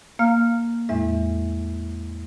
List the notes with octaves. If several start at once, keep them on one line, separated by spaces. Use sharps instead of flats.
A#3 F5 F6
E2 A2 G#3 E5